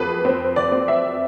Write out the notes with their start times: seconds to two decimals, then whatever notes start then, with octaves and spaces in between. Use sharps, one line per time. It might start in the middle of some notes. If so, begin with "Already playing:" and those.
Already playing: F2 G#4 B4
0.25 C4 C5
0.56 D5
0.72 C4
0.88 E5